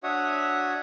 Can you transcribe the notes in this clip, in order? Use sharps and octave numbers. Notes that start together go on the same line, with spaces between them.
D4 F#4 C#5 E5 F#5 D#6